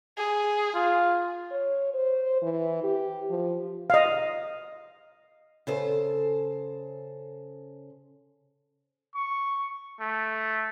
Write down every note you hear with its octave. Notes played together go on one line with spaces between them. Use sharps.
G#4
F4
C#5
C5
E3
G4
F3
D#5 F5
C#3 A4 C5
C#6
A3